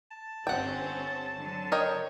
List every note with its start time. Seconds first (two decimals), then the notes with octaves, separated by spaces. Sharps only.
0.11 A5
0.47 G1 C4 C#4 F#5 G5
1.38 D3 F#3
1.72 A#4 C#5 D#5 G5